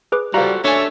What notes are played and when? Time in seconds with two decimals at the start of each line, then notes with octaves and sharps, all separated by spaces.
0.12 G#4 B4 D6
0.34 G3 F4 F#4 A4 C5 F5 A#5
0.64 D4 A4 C#5 E5 G#5 A5